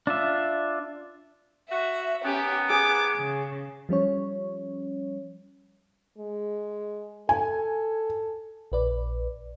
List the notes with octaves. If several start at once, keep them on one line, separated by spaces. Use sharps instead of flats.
D4 F4 E5
F#4 E5
D#3 B3 C#4 G4
G#4 D6
C#3
F3 G3 C#4 C#5
G#3
A4 G#5
A#1 B4 D5